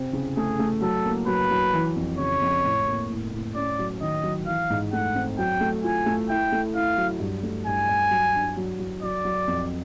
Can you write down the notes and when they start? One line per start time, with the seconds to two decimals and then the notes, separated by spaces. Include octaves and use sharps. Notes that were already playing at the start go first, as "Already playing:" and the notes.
Already playing: C3 C4
0.13 C#3
0.37 A3 G#4
0.59 A3
0.81 F#3 A4
1.05 A#3
1.27 F#3 B4
1.51 F#3
1.73 E3
1.96 F2
2.19 C#3 C#5
2.42 F2
2.64 A2
2.88 A#3
3.10 A2
3.33 A2
3.55 C#4 D5
3.79 F#3
4.01 D#3 D#5
4.23 F#3
4.47 E3 F5
4.70 G#2
4.93 A3 F#5
5.15 C4
5.38 F#3 G5
5.61 A3
5.84 F4 G#5
6.06 A3
6.29 E4 G5
6.52 A3
6.75 E4 F5
6.98 F#3
7.20 G2
7.43 A3
7.66 G2 G#5
7.89 G2
8.11 F#3
8.34 D4
8.57 F#3
8.79 F#3
9.02 F#3 D5
9.25 F#3
9.48 F2